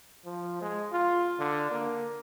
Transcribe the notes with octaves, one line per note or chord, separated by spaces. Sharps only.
F3
G#3
F4
D3
A#3